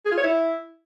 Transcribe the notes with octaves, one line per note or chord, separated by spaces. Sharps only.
G#4
F4
C#5
E4